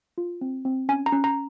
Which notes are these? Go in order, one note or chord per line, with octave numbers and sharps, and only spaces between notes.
F4
C4
C4
C#4 G#5
A#5
C#4
A#5